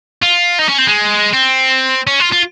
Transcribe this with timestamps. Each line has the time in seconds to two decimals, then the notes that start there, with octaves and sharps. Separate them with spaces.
0.22 F4
0.59 D#4
0.69 C#4
0.78 C4
0.87 G#3
1.34 C4
2.07 C#4
2.20 F4
2.32 F4